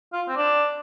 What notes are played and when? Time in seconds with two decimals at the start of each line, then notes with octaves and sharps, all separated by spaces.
0.13 F4
0.28 C4
0.36 D4